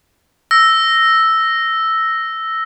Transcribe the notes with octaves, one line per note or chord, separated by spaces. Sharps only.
E6 A#6